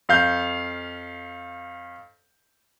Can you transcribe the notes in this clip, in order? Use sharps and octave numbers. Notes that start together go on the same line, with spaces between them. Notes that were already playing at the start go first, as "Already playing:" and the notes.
F2 F5 G6